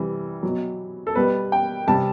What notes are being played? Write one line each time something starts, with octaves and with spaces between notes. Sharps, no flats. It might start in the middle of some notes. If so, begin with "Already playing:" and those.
Already playing: C3 E3 G3
B2 F#3
A4
B2 G3 B4
G5
C3 G3 A5